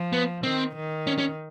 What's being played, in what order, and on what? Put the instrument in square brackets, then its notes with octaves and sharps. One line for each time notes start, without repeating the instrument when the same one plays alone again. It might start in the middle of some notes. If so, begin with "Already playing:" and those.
Already playing: [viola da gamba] F3
[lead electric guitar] B3
[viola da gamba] D#3 [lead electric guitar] C4
[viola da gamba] D#3
[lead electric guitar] C#4
C#4